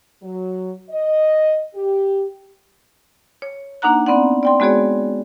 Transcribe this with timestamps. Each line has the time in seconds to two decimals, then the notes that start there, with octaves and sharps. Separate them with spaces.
0.22 F#3
0.90 D#5
1.75 G4
3.42 C#5
3.82 A#3 D4 D#4 F#5 A#5 F#6
4.06 B3 C4 D5 F#5
4.43 D5 G5 C6
4.60 G#3 B3 F#4 G#4 C#5 D5